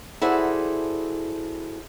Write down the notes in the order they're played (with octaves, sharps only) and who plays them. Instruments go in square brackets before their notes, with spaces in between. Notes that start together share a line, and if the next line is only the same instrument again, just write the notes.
[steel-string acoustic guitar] E4 F#4 G#4 A4 C5 D5